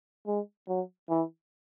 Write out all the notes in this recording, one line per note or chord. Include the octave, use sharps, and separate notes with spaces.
G#3
F#3
E3